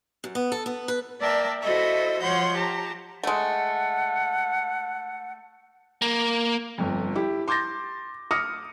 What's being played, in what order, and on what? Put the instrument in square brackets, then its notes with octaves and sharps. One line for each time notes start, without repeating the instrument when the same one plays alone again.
[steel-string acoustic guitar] F#2
B3
A4
B3
B4
[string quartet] A#3 A#4 D5 E5 G5 A5
E4 F#4 A4 C5 D#5 E5
F3 C#5 F#5 C6 G6
G4 A5 A#5
[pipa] G#3 A3 [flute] F#5
[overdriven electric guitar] A#3
[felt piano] G1 F2
E4 G4
C6 D6 G6 A6 A#6
D6 D#6 F6 A#6 C#7